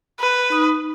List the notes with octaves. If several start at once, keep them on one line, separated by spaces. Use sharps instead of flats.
B4
D#4 D#6